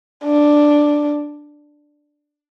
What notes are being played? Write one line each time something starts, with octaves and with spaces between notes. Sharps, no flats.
D4